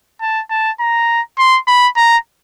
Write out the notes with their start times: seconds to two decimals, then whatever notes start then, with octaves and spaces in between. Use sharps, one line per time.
0.21 A5
0.50 A5
0.80 A#5
1.38 C6
1.67 B5
1.97 A#5